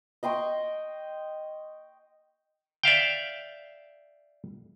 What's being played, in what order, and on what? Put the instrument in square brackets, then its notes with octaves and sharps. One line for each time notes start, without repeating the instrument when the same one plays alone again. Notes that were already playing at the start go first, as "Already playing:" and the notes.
[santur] D#5 G5 C6 C#6
[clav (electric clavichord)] D5 E5 F5 G5